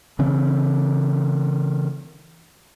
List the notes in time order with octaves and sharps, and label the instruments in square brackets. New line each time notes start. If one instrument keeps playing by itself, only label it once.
[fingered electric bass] C#3 E3 C4